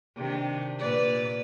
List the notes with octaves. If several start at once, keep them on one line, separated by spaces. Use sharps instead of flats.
C3 D#3 D4
A#2 B4 D5